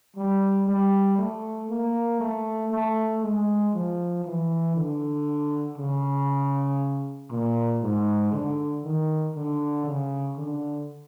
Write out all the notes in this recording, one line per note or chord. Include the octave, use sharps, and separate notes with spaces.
G3
G3
A3
A#3
A3
A3
G#3
F3
E3
D3
C#3
A#2
G#2
D3
D#3
D3
C#3
D3